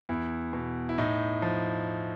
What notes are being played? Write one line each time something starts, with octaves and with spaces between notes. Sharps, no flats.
E2 E4
B2
E4
A2 D#4
F3